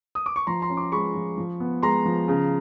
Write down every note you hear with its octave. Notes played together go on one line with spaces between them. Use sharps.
D#6
D6
C#6
F3 A#5 C6
A#5 C6
C#4
C6 D6
G#3 B5 C#6
F3
F3
B3
G#3 A#5 C6
F3
C#3